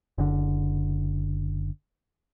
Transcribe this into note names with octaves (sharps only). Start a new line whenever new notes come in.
F#1 D3